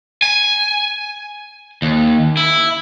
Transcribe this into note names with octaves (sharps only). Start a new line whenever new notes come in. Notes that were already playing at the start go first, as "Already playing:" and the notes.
G#5
D#2
E4